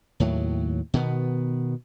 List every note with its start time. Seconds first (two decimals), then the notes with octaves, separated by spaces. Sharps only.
0.20 D#2 A2 F#3
0.94 B2 D#3 B3